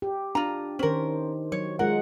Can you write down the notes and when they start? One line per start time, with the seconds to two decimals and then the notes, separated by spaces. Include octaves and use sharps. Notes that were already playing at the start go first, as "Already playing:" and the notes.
0.02 G4
0.35 D4 F4 A#5
0.79 D#3 C#4 A#4 C5
1.52 F#3 C#5
1.79 G#3 F4 A#4 F#5